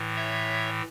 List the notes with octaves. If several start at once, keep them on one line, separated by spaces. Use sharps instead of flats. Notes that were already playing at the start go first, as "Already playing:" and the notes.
Already playing: A2 E3
C#5 E5